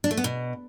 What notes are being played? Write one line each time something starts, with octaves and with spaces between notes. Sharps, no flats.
D4
A3
B3
B2